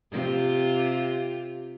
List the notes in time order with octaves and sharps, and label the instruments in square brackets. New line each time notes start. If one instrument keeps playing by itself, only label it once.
[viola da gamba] C3 F4 G4